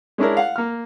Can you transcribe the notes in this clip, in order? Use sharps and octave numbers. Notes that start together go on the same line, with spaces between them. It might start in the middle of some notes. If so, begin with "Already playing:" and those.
G#3 C#4 D4 E4 A#4
F5 F#5
A#3 F6